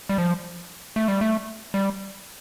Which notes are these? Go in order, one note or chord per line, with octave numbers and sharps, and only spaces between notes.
G3
F3
A3
G3
A3
G3